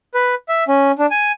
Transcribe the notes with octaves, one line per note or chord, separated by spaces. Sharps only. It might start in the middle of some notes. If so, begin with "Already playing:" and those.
B4
E5
C#4
D4
G#5